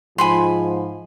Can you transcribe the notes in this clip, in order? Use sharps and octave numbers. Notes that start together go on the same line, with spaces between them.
G#2 F3 G#5 B5 C6